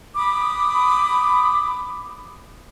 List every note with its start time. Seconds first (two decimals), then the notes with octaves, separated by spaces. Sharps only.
0.15 B5 D6 D#6